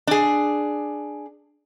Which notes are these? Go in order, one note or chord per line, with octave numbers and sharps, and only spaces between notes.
D4 G#4